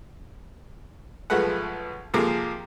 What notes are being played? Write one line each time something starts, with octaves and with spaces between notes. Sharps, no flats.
B1 F3 G#3 A3 B4 F#5
C3 F3 A#3 G#4 A4